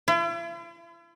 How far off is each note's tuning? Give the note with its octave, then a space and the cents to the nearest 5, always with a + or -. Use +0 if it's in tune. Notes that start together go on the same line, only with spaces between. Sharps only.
E4 +45